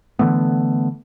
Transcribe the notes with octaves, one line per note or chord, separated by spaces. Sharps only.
D3 E3 A3 B3